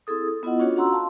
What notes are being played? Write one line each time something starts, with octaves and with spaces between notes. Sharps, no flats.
C4 E4 G#4 A4 D#6
A4
B3 E4 F4 D#5 F#5
C#4 D4 F4 F#4 C#5
C#4 F#4 F#5 A#5 C6 E6
F5 A5 C6